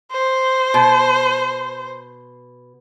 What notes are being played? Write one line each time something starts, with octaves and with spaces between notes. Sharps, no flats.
C5
B2